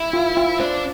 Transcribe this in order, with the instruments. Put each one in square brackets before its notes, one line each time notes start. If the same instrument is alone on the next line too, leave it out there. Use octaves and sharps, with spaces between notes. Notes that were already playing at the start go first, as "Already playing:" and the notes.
Already playing: [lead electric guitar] E4
[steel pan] F4
F4
[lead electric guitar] D4 [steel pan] C5